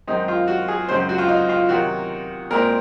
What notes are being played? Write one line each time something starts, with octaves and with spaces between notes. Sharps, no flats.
F#2 D#3 G#3 C4 D#4
F4
F#4
G#4
F#2 C#3 G#3 C4 C5
F#4
F4
D#4
F4
C3 D#3 F#3 F#4
A#2 G#3 C4 A#4